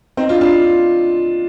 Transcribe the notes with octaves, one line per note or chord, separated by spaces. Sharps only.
C4 D#4
D4 F4
D4 F4